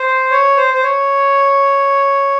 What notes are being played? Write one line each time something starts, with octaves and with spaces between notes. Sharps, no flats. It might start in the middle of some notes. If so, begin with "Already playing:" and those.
Already playing: C5
C#5
C5
C5
C#5